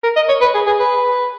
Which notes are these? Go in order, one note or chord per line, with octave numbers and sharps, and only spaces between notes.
A#4
D#5
C#5
B4
G#4
G#4
B4